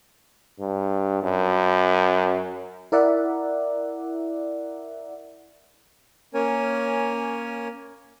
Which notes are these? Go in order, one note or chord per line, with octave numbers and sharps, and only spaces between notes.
G2
F#2
E4 A#4 D5 E5 F#5
A#3 C#4 A#4 C#5 G#5